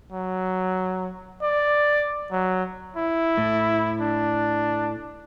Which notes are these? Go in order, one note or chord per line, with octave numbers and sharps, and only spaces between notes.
F#3
D5
F#3
E4
A2
D4